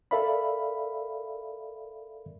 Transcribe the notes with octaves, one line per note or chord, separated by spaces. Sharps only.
A4 A#4 D5 E5 F5 B5